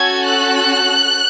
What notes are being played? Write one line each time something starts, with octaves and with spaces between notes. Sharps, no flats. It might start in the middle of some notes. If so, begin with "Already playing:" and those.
Already playing: C#4 F#4 A4 G#6
F#6